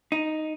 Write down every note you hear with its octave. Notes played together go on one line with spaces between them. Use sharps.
D#4